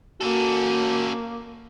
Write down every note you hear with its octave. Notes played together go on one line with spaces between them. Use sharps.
A#3 C#4 F#4 A4